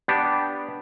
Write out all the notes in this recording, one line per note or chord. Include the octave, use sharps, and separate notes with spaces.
B3 D4 G4